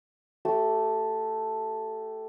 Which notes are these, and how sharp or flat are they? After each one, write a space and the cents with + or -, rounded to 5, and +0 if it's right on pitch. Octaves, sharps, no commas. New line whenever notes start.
A3 +0 G4 -30